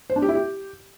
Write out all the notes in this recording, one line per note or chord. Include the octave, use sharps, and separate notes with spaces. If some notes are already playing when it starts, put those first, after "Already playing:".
C5
D4
G4
E4
G4